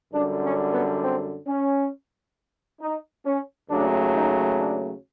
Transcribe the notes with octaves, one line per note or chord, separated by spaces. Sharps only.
F#2 D3 G3 D4
C#4
B3
C4
C#4
D#4
C#4
D#2 C#3 F#3 A3 D4
D#4
D4